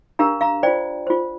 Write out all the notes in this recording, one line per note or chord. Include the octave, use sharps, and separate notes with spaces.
D4 G4 A#4 F5 A#5
F5 A#5
F4 C5 D5 G5
F4 C5